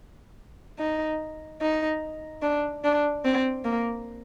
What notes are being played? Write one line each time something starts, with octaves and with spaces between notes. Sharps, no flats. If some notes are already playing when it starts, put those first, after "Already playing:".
D#4
D#4
D4
D4
C4
A#3